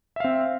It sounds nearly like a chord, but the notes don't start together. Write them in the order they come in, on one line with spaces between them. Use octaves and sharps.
E5 F5 C4